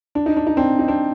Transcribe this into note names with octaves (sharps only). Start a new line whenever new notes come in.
D4
D#4
D4
D#4
C4 D4
D#4
C4 D4